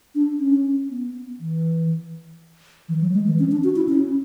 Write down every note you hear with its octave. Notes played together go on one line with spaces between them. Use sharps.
D4
C#4
B3
E3
E3
F#3
G#3
E3
C#4
D4
F#4
E4
C#4